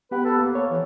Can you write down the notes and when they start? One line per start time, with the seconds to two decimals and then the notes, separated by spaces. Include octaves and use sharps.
0.11 B3 G4 B4 F#5
0.25 A4
0.38 A#3
0.55 C#5
0.71 E3